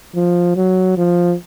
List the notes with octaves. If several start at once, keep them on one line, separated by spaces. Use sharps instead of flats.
F3
F#3
F3